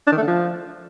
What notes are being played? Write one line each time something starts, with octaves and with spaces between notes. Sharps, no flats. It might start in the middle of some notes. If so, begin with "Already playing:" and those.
D4
D#3
A3
D3
F3